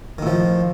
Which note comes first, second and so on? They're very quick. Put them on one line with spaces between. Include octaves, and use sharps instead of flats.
D#3 A2 F3